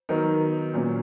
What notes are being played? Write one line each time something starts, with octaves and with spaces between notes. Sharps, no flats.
D#3 F#3 B3 D#4 A#4
A#2 F#3 C#4